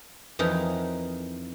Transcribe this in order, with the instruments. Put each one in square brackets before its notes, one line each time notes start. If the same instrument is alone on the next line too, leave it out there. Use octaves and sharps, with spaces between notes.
[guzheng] F2 E3 D#4 A#4